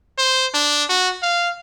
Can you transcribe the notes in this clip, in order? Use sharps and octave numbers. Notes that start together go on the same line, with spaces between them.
C5
D4
F#4
F5